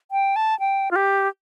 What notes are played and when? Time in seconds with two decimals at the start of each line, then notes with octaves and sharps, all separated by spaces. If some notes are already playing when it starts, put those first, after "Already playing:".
0.11 G5
0.36 A5
0.60 G5
0.91 F4
0.96 G4